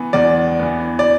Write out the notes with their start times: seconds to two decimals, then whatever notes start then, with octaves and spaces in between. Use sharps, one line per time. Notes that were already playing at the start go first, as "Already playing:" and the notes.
Already playing: E3 B3
0.13 E2 D5
0.59 E3 B3
0.99 D5